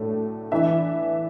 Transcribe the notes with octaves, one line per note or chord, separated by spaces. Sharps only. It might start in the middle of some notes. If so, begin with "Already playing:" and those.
Already playing: A2 F#3 A3 D4 A4
E3 D4 B4 E5